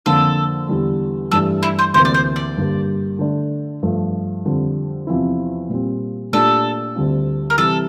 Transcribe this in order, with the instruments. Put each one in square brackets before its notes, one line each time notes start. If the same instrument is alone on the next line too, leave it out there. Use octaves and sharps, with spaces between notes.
[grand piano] F2 D3 F3 A#3 F4 [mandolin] A4
[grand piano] E2 D3 G3
[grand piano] G2 E3 A3 D4 G4 [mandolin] A4
[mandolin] E4
C5
[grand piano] D2 C3 E3 A#3 [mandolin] C5
[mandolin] D5
C5
D5
[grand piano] G2 D3 G3 A#3
D3 A3 D4
G2 F3 A3
F2 D3 G3
E2 C3 F3 C4 E4
A#2 G3 C4
[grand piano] A#2 A3 D4 G4 [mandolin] A4
[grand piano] D2 D3 G3 C4 F4
[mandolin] A#4
[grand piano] C3 E3 G3 [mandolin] A4